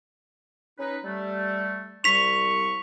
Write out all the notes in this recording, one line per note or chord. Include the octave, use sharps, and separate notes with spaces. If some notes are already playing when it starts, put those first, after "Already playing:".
C#4 D#4 B4
G3 A3
C2 G3 C#6 B6 F7